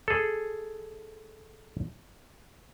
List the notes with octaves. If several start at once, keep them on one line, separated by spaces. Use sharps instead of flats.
G#4 A4